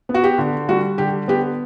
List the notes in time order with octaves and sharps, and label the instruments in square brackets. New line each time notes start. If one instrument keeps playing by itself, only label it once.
[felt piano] B3
F#4
G4
D3
G3 F#4
D3 G4
B3 G4